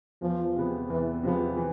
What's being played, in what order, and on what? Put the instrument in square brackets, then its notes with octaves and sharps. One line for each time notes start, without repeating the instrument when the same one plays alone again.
[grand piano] E2 [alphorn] F3
[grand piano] C3 G#3 B3
[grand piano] E2 [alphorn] E3
[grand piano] C3 G#3 B3 [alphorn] F3
[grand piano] E3